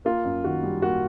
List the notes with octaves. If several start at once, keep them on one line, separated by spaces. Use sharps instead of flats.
A#3 F4
F#2
D#3 F#4
G3
A#3 F#4